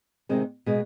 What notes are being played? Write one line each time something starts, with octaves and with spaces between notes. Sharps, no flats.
C3 D#3 G#3 C4
B2 G#3 B3